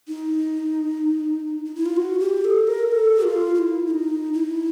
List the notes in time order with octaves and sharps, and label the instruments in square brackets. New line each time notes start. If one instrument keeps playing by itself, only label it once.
[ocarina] D#4
D#4
E4
F4
F#4
G4
A4
A#4
A4
F4
F4
E4
E4
D#4
E4